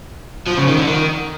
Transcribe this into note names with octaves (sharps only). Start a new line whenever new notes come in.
F3
C#3
D#3
D3
D#3